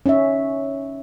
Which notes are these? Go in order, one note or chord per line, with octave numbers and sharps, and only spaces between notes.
C#4 D#4 C#5 E5